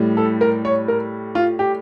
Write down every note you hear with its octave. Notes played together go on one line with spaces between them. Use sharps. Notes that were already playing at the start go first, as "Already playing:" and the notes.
Already playing: A2 G3
A4
A#4
C#5
A#4
F4
G4